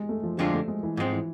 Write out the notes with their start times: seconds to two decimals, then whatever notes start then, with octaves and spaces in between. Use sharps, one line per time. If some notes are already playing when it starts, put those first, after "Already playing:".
Already playing: G#3
0.09 A3
0.23 F3
0.38 F2 D3 F3 G#3 D4 F4
0.53 A3
0.68 G#3
0.83 E3
0.97 G#2 F3 G#3 C4
1.12 E3